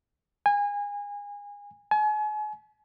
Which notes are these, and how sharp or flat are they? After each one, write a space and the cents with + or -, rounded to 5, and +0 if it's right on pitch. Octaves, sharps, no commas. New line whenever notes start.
G#5 -25
G#5 +40